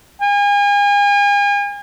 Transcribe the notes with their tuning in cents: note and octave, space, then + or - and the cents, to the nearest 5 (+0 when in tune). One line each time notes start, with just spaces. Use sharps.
G#5 -40